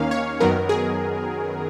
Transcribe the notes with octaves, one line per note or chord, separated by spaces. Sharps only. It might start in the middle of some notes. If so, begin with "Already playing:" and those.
Already playing: D#2 D#3 A#3 C#4 F5
C#5
F#2 D#3 F#3 B3 A#4
G#4